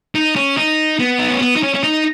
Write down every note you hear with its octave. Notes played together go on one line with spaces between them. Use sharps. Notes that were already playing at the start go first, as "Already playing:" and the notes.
D#4
C#4
D#4
B3
D#4
C#4
B3
D#4
C#4
C#4
D#4